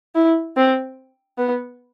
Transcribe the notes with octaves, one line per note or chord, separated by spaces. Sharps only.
E4
C4
B3